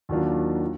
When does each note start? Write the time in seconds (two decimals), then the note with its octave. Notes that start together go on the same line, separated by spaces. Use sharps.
0.09 D#2 D#3 F#3 D4 F4
0.61 F4